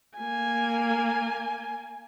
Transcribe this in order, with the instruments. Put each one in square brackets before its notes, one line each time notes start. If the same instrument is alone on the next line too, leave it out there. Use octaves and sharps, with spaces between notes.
[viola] A#3 G#5